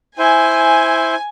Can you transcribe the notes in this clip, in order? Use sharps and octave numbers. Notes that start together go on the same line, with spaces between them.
E4 C5 G#5